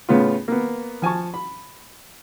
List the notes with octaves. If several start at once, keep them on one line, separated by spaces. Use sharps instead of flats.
A2 C#3 B3 C#4 F4
A#3 B3
F3 G#5 A5 C#6
B5